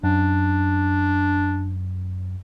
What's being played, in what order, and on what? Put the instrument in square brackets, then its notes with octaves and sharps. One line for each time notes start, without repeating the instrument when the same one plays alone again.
[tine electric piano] F#2 [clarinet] D4